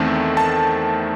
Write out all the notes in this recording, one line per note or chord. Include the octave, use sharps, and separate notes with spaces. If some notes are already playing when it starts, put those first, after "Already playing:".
Already playing: E2 D#3 A3 C4 A5
A5